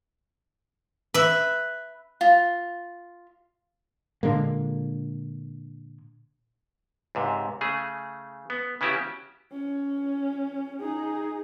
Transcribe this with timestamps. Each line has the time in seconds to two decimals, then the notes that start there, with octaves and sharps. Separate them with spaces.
1.14 B4 E5
2.21 F4
4.23 A#2 D3 G#3 A#3
7.15 C#2 G#2 C3
7.61 C#3 A3 G#4
8.50 B3
8.81 C#3 B3 C#4 E4 F#4 G4
9.52 C#4
10.80 D#4 G#4